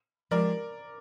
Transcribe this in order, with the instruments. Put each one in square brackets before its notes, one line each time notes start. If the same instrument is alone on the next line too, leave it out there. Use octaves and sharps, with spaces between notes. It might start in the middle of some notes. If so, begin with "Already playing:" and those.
[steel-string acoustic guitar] F3 G#3 C4 G4 [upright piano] A#4 D5